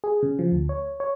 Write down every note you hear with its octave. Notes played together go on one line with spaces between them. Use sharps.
G#4
C#3
F3
D2
C#5
C#5